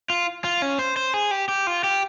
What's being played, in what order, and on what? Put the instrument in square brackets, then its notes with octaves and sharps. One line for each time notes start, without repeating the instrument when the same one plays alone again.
[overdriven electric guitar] F4
F4
C#4
C5
C5
G#4
G4
G4
F4
G4